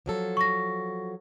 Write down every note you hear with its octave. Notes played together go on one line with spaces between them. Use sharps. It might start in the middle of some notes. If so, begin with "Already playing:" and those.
F3 F#3 A4
C#6 A#6